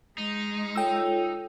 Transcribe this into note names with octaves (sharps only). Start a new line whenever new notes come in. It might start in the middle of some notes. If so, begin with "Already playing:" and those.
G#3 D#4
F4 A4 C#5 G5 E6